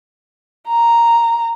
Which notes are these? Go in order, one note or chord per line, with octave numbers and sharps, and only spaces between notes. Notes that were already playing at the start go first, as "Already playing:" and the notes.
A#5